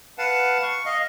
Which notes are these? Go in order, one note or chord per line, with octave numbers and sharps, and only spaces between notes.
B4 F5 F#5 A5
C#6
D#5 F5